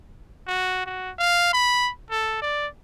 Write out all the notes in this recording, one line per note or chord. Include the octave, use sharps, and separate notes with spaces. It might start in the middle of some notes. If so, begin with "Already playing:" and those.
F#4
F#4
F5
B5
A4
D5